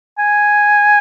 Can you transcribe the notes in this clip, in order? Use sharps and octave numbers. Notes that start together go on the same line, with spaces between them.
G#5